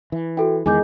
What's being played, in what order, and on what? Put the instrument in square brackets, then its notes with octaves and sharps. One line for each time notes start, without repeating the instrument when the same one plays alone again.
[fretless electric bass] E3
[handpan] E4 [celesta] F#4 A4 G5
[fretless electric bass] E2 D#3 [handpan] G#3 D#4 [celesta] G#5 D6 G6